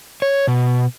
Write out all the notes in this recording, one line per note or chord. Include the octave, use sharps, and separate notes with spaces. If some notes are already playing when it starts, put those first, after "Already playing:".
C#5
B2